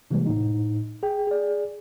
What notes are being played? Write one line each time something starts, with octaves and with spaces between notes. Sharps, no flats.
C3 E3 G3 G#3 A#3
G1 A2 D#4
G#4 G5
G#4 D5